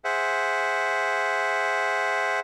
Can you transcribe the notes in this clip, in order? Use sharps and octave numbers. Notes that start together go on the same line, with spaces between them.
G#4 C5 E5 F#5